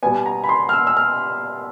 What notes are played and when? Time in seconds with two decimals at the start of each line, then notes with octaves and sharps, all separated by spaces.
0.03 B2 G3 B3 G#5
0.26 A#5
0.44 B5
0.49 C6
0.69 F6
0.73 E6
0.87 E6
0.97 F6